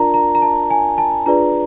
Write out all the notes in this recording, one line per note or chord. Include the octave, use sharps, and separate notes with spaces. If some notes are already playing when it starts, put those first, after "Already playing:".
Already playing: D4 F4 A#4 D5 A5 A#5
A#5
A#5
A5
G#5
A5
D4 F4 G#4 B4 D5 A#5